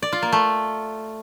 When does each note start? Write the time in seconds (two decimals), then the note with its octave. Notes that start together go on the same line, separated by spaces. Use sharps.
0.02 D5
0.12 F4
0.23 A#3
0.33 A3